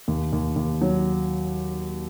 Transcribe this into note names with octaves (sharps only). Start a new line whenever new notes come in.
D#2
D#2
D#2
F#3